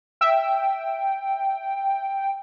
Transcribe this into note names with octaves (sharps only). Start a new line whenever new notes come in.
E5 G5